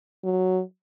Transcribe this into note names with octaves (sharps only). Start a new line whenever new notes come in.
F#3